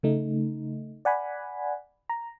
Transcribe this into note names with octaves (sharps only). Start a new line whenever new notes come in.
C#3 A3 D#4
D5 F#5 G#5 B5
A#5